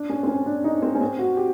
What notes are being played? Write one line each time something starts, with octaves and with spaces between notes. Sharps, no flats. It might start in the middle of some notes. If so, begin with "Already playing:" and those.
Already playing: D4
C#4
C4
C#4
D4
D#4
C4
C#4
C4
F#4
G4